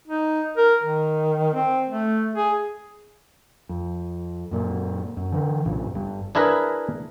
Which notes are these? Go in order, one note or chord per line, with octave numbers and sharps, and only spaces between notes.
D#4
A#4
D#3
C4
A3
G#4
F2
F#2 A#2
F#2
D3 E3
B1 G2 A#2 C#3
G1 G2
D4 E4 G#4 A#4 B4